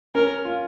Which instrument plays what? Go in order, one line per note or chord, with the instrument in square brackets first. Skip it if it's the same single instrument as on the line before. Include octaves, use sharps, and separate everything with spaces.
[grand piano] C#4 [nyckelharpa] A#4
[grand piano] F4